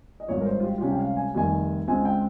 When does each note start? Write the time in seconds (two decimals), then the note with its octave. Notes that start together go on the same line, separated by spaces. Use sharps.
0.20 D#5
0.28 G#1 G2 F3 C#5
0.41 A#4
0.46 C5
0.60 F4
0.64 G4
0.78 F4
0.81 C#2 C3 G3 C#4 G4
0.92 G5
0.99 F5
1.17 G#5
1.34 F1 F2 D#3 G3 G#5
1.87 C#2 C#3 G#3 C4 G#5
2.05 G5